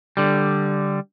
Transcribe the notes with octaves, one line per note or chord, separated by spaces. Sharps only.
D3 G3